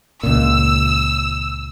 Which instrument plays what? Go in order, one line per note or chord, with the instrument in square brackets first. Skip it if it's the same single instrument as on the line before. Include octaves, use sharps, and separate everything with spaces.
[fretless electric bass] C#2 A#2 [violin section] E6